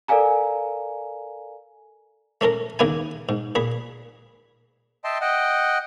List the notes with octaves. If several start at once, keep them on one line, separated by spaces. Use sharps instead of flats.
A4 A#4 D5 F5 G#5 A#5
A3 C#4 A4 A#4
D#2 C#3 A#3 D#4 E4 G#5
G#2
A#2 G#4 B5
D#5 E5 G5 A5 C6
D#5 F#5 G5